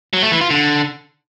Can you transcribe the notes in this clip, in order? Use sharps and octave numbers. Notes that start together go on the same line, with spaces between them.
F#3
A3
E3
F4
D3